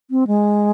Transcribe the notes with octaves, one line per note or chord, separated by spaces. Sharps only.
C4
G#3